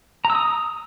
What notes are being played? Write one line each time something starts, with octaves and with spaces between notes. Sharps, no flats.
A#5
E6
D#6